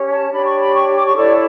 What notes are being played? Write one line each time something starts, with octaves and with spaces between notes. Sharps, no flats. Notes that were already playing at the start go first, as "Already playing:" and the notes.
Already playing: C#4 G4 C#5
A5
D4 G4 C#5 B5
C#6
B5
C#6
D6
C#6
E4 A4 C#5 D5